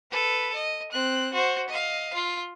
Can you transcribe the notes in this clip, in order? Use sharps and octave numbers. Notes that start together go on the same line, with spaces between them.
A4 B4
D#5
C4 F#6
F#4 C5
D#5 F5
F4